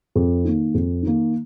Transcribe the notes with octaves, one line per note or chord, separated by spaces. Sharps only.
F2
D#3 A#3
F2
D#3 A#3